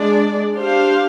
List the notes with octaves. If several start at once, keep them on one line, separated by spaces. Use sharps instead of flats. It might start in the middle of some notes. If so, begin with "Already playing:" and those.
Already playing: G#3 D4 G#4 D5
D4 G4 C5 F5